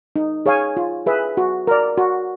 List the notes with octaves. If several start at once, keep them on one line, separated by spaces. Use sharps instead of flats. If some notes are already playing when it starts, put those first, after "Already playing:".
D#4
G#4 C#5 F5 G#5
F4
G#4 B4 E5
F#4
A#4 D5
F#4